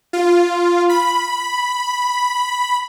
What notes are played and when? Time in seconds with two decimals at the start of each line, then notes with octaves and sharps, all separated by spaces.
0.13 F4
0.89 B5